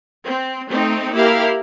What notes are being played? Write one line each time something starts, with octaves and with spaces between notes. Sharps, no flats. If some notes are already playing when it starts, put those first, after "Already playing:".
C4
A3 C4 D#4
A#3 E4 G4 A#4 F5